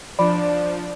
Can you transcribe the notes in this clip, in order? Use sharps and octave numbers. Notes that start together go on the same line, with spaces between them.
F3 D4 D5 B5